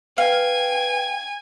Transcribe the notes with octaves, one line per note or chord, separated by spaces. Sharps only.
B4 F5 G5 G#5